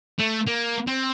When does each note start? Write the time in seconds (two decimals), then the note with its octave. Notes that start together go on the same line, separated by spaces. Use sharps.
0.20 A3
0.47 A#3
0.87 C4